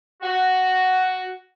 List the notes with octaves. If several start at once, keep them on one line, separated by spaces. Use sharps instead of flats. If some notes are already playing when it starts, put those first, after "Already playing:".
F#4